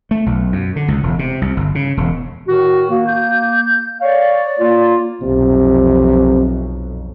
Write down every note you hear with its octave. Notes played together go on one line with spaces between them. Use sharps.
A3
B1
F#2
D3
C#2
E1
C3
C2
G1
C#3
E1
A2 D#3 F#4
A#3 F#4
G6
C#5 D5 F5
A#3 F4
B1 F2 C3